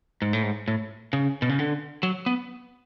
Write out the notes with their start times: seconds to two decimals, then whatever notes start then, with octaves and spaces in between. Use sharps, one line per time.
0.22 G#2
0.33 A2
0.43 G#2
0.68 A2
1.13 C#3
1.42 B2
1.49 C#3
1.59 D3
2.03 F#3
2.26 B3